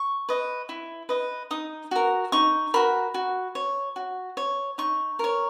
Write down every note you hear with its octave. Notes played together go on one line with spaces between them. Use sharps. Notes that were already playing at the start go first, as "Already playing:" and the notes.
Already playing: C#6
B4 D#5
E4
B4 D#5
D#4 D#6
F#4 A#4
D#4 C#6
F#4 A#4 B5
F#4
C#5
F#4
C#5
D#4 C#6
A#4 C#5